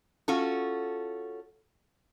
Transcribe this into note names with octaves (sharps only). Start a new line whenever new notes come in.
C#4 F4 F#4 A4